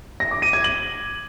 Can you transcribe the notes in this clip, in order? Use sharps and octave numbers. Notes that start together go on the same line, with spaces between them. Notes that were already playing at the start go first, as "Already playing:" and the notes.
A#6
D6
D#7
G#6
F#7